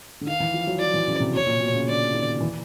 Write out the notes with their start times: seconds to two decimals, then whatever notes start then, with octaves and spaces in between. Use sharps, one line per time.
0.21 D3
0.27 D#3 F5
0.40 E3
0.54 F3
0.67 F#3
0.80 F3 D5
0.94 E3
1.07 C#3
1.20 C3
1.33 B2 C#5
1.47 A#2
1.60 B2
1.74 C#3
1.88 D3 D5
2.14 D#3
2.41 E3